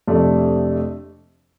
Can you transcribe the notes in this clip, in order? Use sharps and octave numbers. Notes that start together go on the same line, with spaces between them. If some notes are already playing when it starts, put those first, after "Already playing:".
F2 C3 A3 D4